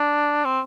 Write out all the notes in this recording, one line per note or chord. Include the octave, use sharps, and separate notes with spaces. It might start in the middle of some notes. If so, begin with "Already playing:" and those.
Already playing: D4
C4